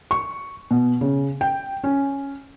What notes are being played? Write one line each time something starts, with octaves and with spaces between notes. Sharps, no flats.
C#6
B2
C#3
G5
C#4